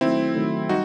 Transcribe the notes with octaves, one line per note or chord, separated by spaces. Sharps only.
D#3 F#3 A3 C4 E4
D#3 F#3 A3
G3 D#4 F#4